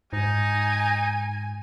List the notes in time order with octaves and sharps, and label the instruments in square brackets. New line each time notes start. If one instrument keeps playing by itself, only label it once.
[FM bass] G#2 [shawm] D#4 [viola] G#5